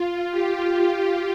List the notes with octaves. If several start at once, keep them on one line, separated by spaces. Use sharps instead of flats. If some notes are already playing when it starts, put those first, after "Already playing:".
Already playing: F4
G4